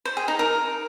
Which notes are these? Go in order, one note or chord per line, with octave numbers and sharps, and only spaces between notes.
C5
G#4
D#4
A#4